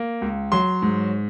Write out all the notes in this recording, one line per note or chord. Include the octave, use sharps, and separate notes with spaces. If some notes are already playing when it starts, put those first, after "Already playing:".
Already playing: A#3
C#2
F#3 C6
G#2